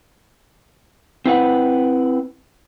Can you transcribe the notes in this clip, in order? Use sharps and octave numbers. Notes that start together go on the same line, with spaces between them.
C4 E4 B4 F#5